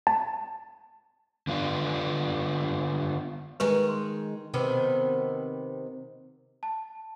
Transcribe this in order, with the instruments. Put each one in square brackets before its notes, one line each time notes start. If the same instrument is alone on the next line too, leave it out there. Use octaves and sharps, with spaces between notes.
[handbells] A5
[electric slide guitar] D3 B3 F4
[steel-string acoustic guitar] D#3 G#3 D#4 [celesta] B4 C#6
[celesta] C6
[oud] C3 D#3 B3
[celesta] A5